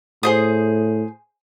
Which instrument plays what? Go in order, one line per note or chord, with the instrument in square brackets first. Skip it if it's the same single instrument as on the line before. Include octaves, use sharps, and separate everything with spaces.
[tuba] A2 [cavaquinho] G#4 C5 D#6